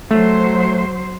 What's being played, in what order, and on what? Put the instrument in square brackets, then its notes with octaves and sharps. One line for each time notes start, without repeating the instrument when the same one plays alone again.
[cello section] F#3 C5 [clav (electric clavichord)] A3